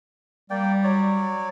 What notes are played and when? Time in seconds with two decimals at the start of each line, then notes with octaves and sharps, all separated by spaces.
0.50 G3 A#3 D5 G5
0.84 F#3 C#5 D5